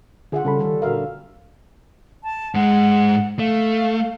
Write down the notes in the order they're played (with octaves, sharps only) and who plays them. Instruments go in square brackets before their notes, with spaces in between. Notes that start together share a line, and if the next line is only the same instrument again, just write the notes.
[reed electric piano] D3 G#4 [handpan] F4 E5 F#5
[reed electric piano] C#3 A4 B5 [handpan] G3 C#4
[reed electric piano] D#3 [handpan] G3 A4
[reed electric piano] A#2 F#4 A#4 [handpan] D3 E5 F5
[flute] A5
[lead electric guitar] G#2 G#3 [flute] F#5
[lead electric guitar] A3 [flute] F5